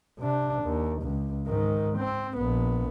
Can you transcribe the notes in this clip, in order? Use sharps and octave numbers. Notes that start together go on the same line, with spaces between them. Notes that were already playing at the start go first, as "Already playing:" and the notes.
C3 D4
D#2
C#2
G#2 D#3
C4
A#1 B3